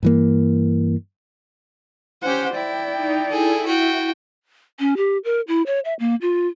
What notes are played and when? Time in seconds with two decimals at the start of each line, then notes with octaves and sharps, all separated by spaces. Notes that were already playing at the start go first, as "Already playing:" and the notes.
0.03 G2 E3 A#3
2.22 C#4 G4 C5 F#5
2.54 E4 D5 G5
2.94 D#4
3.28 E4 G#4 A4
3.66 F#4 G5
4.79 C#4
4.97 G4
5.24 A#4
5.48 E4
5.66 C#5
5.85 E5
5.99 A#3
6.21 F4